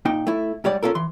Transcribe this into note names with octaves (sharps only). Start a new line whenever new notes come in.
A#2 D#4 G5
A3 E4
G#2 G3 C#5 D5
C#4 D4 F4 A4 A#4
E3 C6